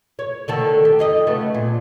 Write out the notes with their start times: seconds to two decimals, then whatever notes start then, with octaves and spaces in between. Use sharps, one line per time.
0.19 C#5
0.48 D3 D#3 A4
0.85 G4
0.99 F2 D#4 D#5
1.27 C#3 A3 B3
1.54 A#2